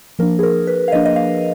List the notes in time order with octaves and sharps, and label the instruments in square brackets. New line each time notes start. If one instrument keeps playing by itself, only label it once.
[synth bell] F3 A#3 D4 A#4
G#4
A#4
B4
F5
F3 A#3 D4 D#5
D#5
F5